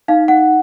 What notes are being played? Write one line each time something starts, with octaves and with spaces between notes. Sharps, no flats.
D#4 F5
F#5